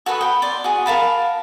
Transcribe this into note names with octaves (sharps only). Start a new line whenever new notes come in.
F#4 A4 B4 D#6
G5 B5
D5 C6
F#4 G#4
A#4 F5 A5 B5